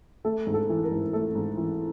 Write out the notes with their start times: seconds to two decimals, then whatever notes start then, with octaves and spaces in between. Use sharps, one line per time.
0.25 A3 A4
0.47 G#2
0.54 A4
0.69 E3
0.84 A#4
0.92 G#2
1.13 A3 A4
1.35 G#2
1.57 E3